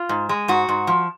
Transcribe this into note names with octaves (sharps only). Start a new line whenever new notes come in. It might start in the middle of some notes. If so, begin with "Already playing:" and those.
Already playing: F4
G#2
G#3
G#2 F#4
G#2
F3